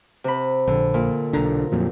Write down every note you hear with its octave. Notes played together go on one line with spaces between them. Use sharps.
C3 B5
A#1 D3
A#2
B1 D3 A#5
F2 A#2 F#3